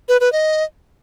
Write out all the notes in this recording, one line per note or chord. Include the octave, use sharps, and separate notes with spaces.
B4
B4
D#5